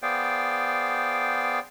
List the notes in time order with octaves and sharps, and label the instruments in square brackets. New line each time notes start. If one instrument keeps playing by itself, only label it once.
[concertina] B3 G#4 C5 D5 F5 G5